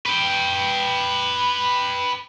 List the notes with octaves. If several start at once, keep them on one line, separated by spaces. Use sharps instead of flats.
B4 G5